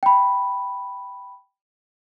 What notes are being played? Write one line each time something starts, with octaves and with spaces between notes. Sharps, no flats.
G5 B5